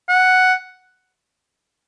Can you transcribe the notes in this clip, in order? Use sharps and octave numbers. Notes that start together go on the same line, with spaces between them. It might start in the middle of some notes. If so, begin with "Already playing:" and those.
F#5